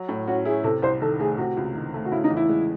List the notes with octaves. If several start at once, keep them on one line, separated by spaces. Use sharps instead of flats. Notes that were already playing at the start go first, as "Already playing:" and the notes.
Already playing: F#3
A2
C#4 F#4
E4 G#4
C3 A4
C2 C5
D#3 A4
A3 G#4
C3 F#4
C#2
D#3
A3
F#4
C#3 E4
D#4
E2
E4
G#3